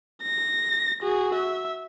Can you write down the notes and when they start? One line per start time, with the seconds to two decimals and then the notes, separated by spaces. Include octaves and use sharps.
0.23 A#6
1.03 F#4 G#4
1.35 E5